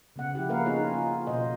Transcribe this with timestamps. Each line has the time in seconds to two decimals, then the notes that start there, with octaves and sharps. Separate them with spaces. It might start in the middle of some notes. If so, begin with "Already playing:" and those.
0.16 C#3 B3 F#5
0.35 F3 E4 G4
0.49 A#3 A#4 B4 F5 F#5
0.65 B3 C#4 D#4 F4 G#4 C#5
0.94 F4
1.27 B2 F4 C5 D#5